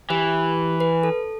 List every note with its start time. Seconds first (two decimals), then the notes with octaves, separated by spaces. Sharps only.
0.10 E3 G4
0.80 B4
1.03 A4